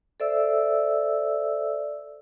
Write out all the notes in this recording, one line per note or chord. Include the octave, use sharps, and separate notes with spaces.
A4 C5 D5 E5 E6